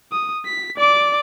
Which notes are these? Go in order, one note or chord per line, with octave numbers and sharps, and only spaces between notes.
D#6
B6
D5 D6